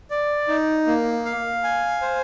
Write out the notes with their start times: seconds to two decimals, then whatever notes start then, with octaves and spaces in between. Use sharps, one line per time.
0.10 D5
0.48 D#4
0.87 A#3
1.25 F5
1.63 G#5
2.01 C5